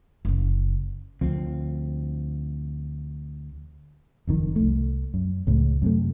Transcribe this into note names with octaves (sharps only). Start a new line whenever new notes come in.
F#1 C#3
D2 F3 C4
F#1 F2 D#3
C2 A3
F#2
C#2 A2
F#2 C3 A3